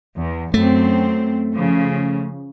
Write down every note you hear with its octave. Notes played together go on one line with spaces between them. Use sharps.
E2
F#2 A3 C4
C#3 F3